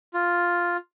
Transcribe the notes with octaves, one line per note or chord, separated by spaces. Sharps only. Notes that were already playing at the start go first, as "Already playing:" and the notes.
F4